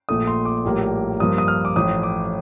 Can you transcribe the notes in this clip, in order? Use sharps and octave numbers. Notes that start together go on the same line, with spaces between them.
A#1 A#2 A3 D#6
C6
D6
A#1 A2 G3 A#3
G2 F3 A#3 D#6
D#6
F6
D6
A1 A2 F3 D#6
D6